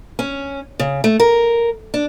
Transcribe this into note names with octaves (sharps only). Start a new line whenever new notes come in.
C#4
C#3
A3
A#4
D4